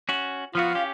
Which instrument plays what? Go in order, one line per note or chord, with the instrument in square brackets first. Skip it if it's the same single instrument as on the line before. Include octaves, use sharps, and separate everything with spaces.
[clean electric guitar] C#4 F#4
[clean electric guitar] F3 B3 F#4 [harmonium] F4 F5
[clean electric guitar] C#4 G4